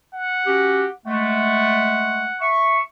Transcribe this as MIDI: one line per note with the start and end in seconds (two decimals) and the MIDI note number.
0.13 0.94 78
0.47 0.86 61
0.47 0.86 66
0.47 0.86 67
1.06 2.28 56
1.06 2.28 57
1.06 2.51 78
2.41 2.79 76
2.41 2.79 85